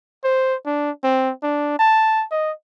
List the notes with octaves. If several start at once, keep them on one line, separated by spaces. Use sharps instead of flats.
C5
D4
C4
D4
A5
D#5